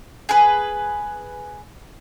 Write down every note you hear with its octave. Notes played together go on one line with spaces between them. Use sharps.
G#4 B4